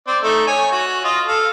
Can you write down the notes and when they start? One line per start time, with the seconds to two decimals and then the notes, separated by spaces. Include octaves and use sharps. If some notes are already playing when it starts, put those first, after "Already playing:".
0.07 C4 D5
0.23 A3 D#4 A4
0.47 C#5 G#5
0.72 F#4
1.04 F4 D#5 F6
1.28 A4 F5